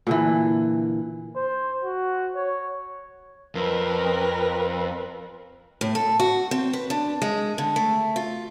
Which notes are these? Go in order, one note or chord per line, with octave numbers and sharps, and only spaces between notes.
A#2 D3 E3
C5
F#4
C#5
F2 A#4 B4
A2
A4
F#4
C4
B4
D4
G#3
D3
A3
F4